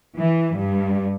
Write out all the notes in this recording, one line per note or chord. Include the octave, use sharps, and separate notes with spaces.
E3
G2